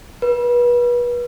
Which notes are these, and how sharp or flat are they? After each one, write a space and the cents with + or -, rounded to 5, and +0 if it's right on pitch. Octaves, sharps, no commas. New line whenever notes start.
B4 -30